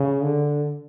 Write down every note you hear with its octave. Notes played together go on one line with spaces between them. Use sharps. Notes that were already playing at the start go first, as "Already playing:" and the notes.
Already playing: C#3
D3